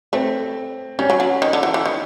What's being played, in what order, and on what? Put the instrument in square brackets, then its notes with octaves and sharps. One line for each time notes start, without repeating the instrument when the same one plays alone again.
[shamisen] A3 [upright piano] C4
[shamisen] G3 [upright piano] C#4
[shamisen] F#3
F#3
D#3
D3
E3
E3
D#3